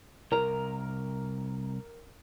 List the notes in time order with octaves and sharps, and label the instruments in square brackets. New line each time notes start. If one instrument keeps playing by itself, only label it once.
[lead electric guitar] C2 A#5 [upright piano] A#4